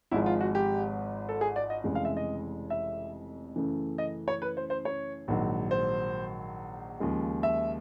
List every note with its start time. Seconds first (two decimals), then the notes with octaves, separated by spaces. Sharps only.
0.11 G#1 G#2 F3 G#3 E4
0.26 F4
0.41 F#4
0.55 G4
1.29 A4
1.41 G#4
1.56 D5
1.70 D#5
1.84 F1 F2 C#3 E3 G#3
1.95 F5
2.05 E5
2.17 D#5
2.70 E5
3.56 F#2 C#3 E3 A3
3.98 D#5
4.28 C#5
4.42 B4
4.57 C5
4.70 C5
4.85 C#5
5.28 A#1 G#2 D#3 F#3
5.71 C5
7.00 D#2 C#3 F3 G#3
7.43 E5